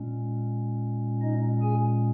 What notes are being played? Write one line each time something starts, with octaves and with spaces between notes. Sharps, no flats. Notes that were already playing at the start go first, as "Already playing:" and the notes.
Already playing: A#2 G#3 C#4
D#4 D#5
G#4 G#5